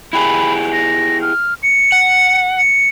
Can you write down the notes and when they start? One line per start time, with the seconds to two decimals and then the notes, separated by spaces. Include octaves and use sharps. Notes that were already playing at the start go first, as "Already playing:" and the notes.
0.13 E4 G4 G#4 B5
0.73 A#6
1.22 F6
1.63 C#7
1.92 F#5
2.58 C#7